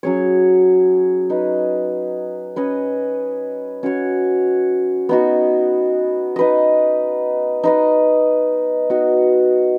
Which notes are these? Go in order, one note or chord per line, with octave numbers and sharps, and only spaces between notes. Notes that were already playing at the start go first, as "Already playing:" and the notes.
F#3 C#4 G#4 C#5
D#4 B4 D#5
C#4 B4 D#5
C#4 F#4 C#5
B3 D#4 F#4
D#4 B4 D#5
D#4 B4 D#5
B3 D#4 F#4 D#5